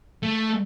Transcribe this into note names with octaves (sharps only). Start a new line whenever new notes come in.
A3